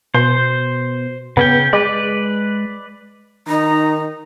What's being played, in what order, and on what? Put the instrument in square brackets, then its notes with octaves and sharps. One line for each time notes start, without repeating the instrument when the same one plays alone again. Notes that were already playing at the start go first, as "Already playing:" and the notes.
[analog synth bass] B2 [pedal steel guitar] C5
[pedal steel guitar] C#3 C#4 G5 [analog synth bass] B3
[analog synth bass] G#3 [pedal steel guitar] B4 D5
[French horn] D#3 [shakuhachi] D#4 [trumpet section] A#5